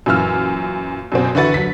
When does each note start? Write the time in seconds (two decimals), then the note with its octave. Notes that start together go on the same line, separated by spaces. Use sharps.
0.06 F#2 A#2 E3 E6 F6
1.12 F#2 B2 C4
1.35 D3 E3 E4 F#4 B4 A6
1.54 F#3 B6